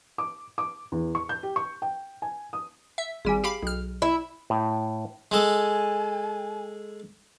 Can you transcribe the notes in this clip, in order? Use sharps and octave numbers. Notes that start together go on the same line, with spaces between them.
D6
D6
E2
C#6
G6
G4
C#6
G5
G#5
D#6
E5
G#1 G3 G#4 G#5
G4 F5 B5
B1 F6
E4
A2 G5
G#3 A4 G#5